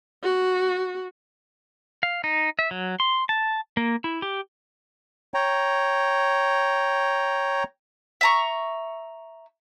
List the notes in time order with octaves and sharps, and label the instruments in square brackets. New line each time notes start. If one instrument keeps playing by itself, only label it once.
[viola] F#4
[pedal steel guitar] F5
D#4
E5
F#3
C6
A5
A#3
E4
G4
[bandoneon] C#5 G5 A#5
[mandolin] E5 A#5 C#6